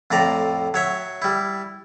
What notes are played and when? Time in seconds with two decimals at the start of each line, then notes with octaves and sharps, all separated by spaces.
0.11 F2 A2 D5 A#5
0.74 F#3 C#5 E5
1.22 G3 E4